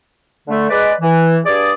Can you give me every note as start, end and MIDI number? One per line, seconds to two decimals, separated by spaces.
0.48 0.65 50
0.48 0.65 57
0.70 0.92 56
0.70 0.92 71
0.70 0.92 74
1.01 1.38 52
1.45 1.72 43
1.45 1.72 68
1.45 1.72 74